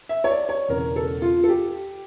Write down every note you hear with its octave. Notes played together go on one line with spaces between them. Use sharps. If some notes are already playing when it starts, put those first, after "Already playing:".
E5
C#5
D5
C#5
E1 E2 C#3 A#4
A4
F4
A4
G4